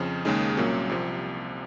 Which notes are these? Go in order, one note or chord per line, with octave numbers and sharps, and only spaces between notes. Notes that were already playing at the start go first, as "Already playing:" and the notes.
Already playing: F2 C#3 F3
D#2 C#3 G#3 D#4 G#4
C2 A#2 F#3 A#3 C#4
C2 C3 F3